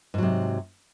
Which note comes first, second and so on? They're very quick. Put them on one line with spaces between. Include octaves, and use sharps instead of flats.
G#2 F#3 C3